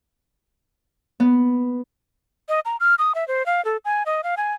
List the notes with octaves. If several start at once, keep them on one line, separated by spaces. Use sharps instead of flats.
B3
D#5
A#5
F6
D#6
E5
C5
F5
A4
G#5
D#5
F5
G#5